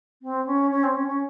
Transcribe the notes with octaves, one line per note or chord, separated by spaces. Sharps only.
C4
C#4
C#4
C4
C#4
C#4